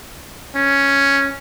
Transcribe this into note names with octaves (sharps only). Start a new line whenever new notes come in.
C#4